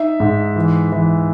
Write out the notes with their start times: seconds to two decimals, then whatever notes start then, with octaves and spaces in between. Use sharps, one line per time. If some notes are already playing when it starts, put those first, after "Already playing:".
Already playing: D#4 E5
0.20 G#2
0.56 E3
0.92 E3